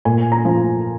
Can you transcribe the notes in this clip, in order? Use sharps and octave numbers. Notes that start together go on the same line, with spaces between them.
A#2 G#5
A#5
F3